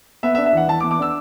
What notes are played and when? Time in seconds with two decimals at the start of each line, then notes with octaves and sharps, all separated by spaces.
0.23 B3 E5
0.35 E5
0.38 D4
0.46 E5
0.53 E3 F#5
0.68 E3 A5
0.80 D6
0.83 B3
0.91 D6
0.99 D4 E6